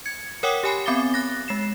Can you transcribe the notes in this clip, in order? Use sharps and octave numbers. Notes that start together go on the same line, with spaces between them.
G#6 C#7
A#4 C#5 F#5 G5 D6 D#6
G4 C#5 G#5 B5 C7
B3 C4 B5 D6 A6 G7
F#6 A6 A#6
G#3 C7 E7